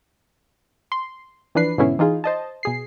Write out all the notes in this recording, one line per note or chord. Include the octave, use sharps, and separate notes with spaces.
C6
E3 F3 D4 B4 C7
G#2 B2 D3 B3 C#4 E4
E3 D#4 F4 G#4
C5 D#5 A5
B2 G#4 C7